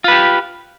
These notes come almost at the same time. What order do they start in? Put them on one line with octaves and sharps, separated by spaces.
F4 B4 G4